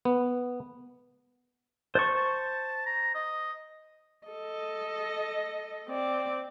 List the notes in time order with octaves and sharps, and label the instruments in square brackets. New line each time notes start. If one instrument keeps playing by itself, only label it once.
[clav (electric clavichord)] B3
[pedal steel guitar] C5 C#6 [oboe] A5
[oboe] A5
A#5
D#5
[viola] A4 D#5
C4 D5